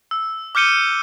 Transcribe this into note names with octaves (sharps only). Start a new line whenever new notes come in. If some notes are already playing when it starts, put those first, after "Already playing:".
E6
D6 F6 G6 C#7 D#7 G7